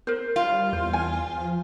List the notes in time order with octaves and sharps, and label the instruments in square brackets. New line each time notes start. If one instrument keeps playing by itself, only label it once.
[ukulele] A#4 C5
[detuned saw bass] G3 [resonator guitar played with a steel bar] F4
[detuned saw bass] E2 [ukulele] C5
[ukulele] G#5
[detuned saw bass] F3